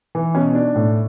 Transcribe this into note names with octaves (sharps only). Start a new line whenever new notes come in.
E3
B2 C#4
D4
A2